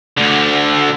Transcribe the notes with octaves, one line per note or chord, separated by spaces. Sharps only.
D2 D3